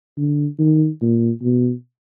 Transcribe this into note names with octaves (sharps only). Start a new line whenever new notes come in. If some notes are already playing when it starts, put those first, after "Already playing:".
D3
D#3
A#2
B2